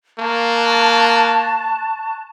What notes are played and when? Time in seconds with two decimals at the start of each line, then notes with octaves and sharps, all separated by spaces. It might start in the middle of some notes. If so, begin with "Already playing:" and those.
0.19 A#3 A5 C#6 F#6